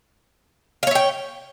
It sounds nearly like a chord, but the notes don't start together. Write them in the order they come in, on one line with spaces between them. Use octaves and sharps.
F5 C#5 E5 G5